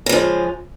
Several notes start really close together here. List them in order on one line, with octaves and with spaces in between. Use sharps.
C#3 F3 G#3